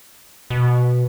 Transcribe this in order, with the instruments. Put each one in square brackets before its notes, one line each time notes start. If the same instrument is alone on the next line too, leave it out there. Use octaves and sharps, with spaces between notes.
[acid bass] B2